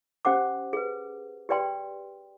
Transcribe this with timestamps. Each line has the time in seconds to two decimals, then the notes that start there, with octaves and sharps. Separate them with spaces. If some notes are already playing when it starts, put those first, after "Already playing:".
0.25 C#4 G4 C5 F#5 D6
0.73 G#4 B4
1.49 G4 B4 D5 G5 C6